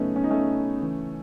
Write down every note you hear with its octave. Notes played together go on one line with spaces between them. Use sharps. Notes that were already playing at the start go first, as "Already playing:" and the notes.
Already playing: C#3 F#3 A3 B3 C#4 D#4
C#4
D#4
A3 C#4
C#3 E3